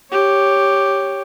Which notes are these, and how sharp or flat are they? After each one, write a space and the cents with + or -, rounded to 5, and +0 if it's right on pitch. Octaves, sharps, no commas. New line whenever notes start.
G4 +0 C#5 +0